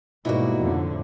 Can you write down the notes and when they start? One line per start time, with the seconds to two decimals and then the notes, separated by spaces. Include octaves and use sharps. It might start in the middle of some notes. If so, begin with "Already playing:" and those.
0.25 G#2 B2 G3 A#3 D#4 E4 F#4
0.60 F2 A2 D3